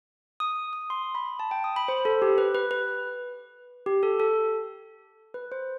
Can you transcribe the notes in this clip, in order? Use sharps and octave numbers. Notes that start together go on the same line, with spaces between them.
D#6
D#6
C6
B5
A5
G5
D#6
B5
C5
A4
G4
B4
B4
B4
G4
A4
A4
B4
C5